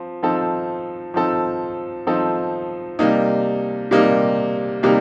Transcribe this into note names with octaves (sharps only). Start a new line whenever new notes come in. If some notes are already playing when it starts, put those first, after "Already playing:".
Already playing: F3 C4
F3 C4 D#4 A4
F3 C4 D#4 A4
F3 C4 D#4 A4
C3 G3 A#3 D#4
C3 G3 A#3 D#4
C3 G3 A#3 D#4